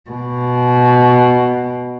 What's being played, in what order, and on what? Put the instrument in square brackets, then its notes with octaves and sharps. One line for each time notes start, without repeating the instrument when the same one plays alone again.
[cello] B2